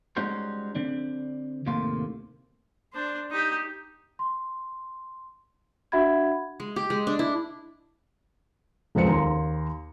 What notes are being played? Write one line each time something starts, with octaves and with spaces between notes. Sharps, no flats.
G3 G#3 C#4 D#4 F#4 C5
D3 C4 D4
D#2 A2 C3 A#3 F5 C6
D4 C5
D#4 G4
C6
D4 F#4 E5 F#5 B5 G#6
G#3
G4
G#3
D4
E4
F1 C#2 B4 C5 C#7
D#2 A#5 C6